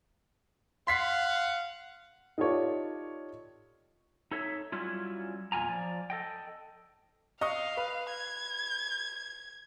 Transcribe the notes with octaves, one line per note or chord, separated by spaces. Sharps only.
F5 F#5 C6 B6 C7
D#4 F4 G4 A4 C#5 D5
D#4 A4 C#5 E5
F#3 G3 C#4 E4 F4
E2 A#2 F4 G#5 A#5
F3 D5
A4 D#5 G5
D#5 F5 C#6 D#6
B4
G#6